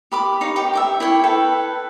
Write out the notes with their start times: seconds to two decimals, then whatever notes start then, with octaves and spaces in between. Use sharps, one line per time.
0.12 G4 B5 D6
0.41 D#4 C#5 F5
0.56 G4 G5 D6
0.73 E5 G5 D6
1.00 E4 C#5 G5
1.24 A4 B4 G5